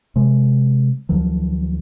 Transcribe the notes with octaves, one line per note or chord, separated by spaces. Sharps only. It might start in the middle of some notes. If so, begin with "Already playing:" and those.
C3 G#3
D2 D#3 F3 F#3